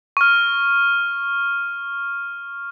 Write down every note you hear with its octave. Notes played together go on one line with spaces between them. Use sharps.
C#6 F6